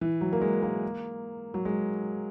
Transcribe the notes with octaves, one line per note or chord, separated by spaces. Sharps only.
E3
F#3
A#3
G#3
A#3
F#3
G#3